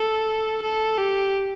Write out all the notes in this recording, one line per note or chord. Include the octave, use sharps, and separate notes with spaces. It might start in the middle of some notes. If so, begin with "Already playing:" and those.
Already playing: A4
A4
G4